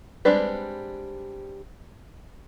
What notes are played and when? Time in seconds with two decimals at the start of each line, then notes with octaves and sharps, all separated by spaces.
0.25 G3 G#3 C4 D4 B4